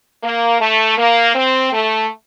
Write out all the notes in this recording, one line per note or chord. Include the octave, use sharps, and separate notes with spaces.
A#3
A3
A#3
C4
A3